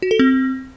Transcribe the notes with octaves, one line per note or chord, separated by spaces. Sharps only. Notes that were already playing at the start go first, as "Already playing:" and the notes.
F#4
A4
C4